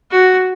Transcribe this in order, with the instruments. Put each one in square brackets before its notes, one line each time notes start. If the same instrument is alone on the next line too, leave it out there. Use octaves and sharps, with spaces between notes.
[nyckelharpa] F#4